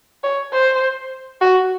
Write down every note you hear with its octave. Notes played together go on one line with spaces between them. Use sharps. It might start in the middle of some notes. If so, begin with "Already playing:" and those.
C#5
C5
F#4